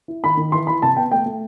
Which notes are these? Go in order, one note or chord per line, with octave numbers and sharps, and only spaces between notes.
E4
D#3 B5
D#3
E3 C6
E3 B5
C3 A5
B3 G5
A3 G5
A3